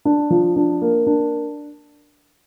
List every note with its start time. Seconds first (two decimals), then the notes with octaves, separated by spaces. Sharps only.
0.05 D4
0.30 F3
0.56 D4
0.82 A#3
1.07 D4